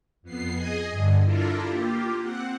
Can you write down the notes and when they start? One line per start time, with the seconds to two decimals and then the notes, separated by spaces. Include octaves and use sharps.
0.22 F2 B3 C7
0.53 G#4 D#5 G#5
0.90 G2 D3
1.23 D4 E4 F4 A4 A#4
1.64 A#3 F4 G4
2.19 C4 F#5